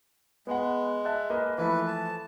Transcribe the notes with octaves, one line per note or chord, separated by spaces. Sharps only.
G#3 B3 F#5
E5 A5 F#6
A#3 B4 D#5
E3 F3 A3 B4
A5